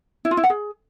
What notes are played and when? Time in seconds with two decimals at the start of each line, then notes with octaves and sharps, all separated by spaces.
0.25 E4
0.31 F4
0.37 E4
0.44 F#5
0.50 G#4